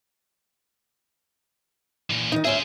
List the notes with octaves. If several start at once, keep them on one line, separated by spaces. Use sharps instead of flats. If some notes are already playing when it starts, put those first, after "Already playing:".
A#2 E3
D#3 D#4
D2 C#4 G#4 C5 E5